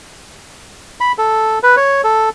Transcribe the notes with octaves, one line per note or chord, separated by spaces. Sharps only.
B5
A4
B4
C#5
A4